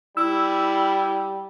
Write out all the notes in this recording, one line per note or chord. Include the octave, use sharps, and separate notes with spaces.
G3 E4 E6